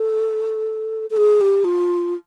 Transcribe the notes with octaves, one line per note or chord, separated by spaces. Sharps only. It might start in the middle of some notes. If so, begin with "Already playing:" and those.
Already playing: A4
A4
G#4
G4
F4